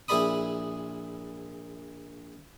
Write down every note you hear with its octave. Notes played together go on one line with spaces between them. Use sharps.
A#1 E4 G#4 D5 B5 D#6